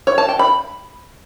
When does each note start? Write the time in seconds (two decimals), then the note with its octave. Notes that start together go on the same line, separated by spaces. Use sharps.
0.07 C#5
0.18 A5
0.29 G5
0.39 B5